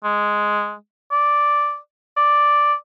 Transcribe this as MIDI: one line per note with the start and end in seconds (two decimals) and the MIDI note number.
0.04 0.74 56
1.12 1.77 74
2.17 2.74 74